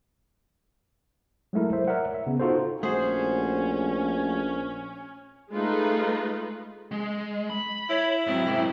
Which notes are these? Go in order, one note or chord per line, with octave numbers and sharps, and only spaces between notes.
F#3 G#3 A3 E4 A#4
C5 E5
A#4 C#5 D5 E5 F#5
E5
C#3 B3
D#4 F4 F#4 A4 C5
A#1 A3 C#4 F#4 G#4 C5
G#3 A3 D#4 F4 B4
G#3
B5
E4 C#5
G#2 F#3 C4
G#2 C3